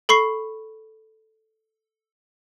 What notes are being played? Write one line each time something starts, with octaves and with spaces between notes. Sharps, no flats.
A4 B5 C#6 C7